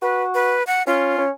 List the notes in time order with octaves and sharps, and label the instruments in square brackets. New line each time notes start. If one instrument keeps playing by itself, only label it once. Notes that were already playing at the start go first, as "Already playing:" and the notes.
[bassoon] F#4 [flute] B4
[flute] B4
F#5
[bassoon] C#4 [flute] F4
[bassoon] C#4